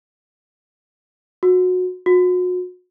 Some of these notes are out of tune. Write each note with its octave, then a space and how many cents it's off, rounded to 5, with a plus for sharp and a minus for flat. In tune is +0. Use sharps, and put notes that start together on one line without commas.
F#4 -20
F#4 -35